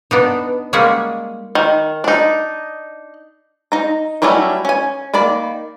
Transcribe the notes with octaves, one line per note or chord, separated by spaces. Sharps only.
B3 D4 D#4
G3 G#3 A#3 C#4 G#4 F#5
D#3
D4 D#4
D#4 A#5
F#3 G3 A3 C#4 E4
C#4 G#5
D#3 A#3 D5 B5